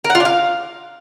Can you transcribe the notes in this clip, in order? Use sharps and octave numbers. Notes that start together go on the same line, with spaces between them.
A#4
F#5
F4
D4
F5